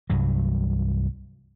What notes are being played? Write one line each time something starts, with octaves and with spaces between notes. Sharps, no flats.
C2 G2 F#3